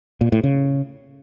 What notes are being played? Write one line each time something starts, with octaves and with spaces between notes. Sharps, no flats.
A#2
A2
C#3